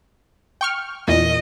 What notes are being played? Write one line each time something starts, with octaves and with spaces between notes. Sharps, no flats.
G5 C#6 F6
E2 A#2 D#5